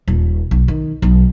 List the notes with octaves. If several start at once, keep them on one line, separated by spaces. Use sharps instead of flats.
D#1
B1
D#3
B1